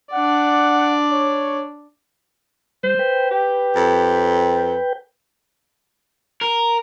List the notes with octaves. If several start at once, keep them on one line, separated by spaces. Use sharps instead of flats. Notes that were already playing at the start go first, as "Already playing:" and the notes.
D4 D5 F#5
C#5
G3 C5
B4 G5
G4
F2
A#4